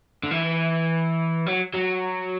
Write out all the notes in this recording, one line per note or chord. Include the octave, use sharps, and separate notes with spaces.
D3
E3
F#3
F#3